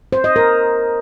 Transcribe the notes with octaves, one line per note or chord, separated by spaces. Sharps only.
C5
D#5
A#4